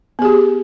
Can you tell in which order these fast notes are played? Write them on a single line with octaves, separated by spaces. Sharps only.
B3 G#4 G4